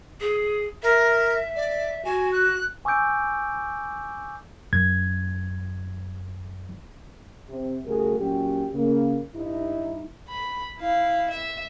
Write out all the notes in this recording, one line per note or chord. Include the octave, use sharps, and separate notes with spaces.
G#4
A#4 E5
D5
F#4 G#5
F#6
G#5 C#6 D6 E6 G6 D7
F#2 G#6
C3
C#3 G3 A3 F#4 G#4 A#4
A#2 F#3 C#4 F#4 G4
C#3 A#3
G2 D#4 E4
B5
E4 F5
E5